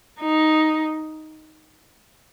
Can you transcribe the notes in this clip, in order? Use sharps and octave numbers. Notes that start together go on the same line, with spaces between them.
D#4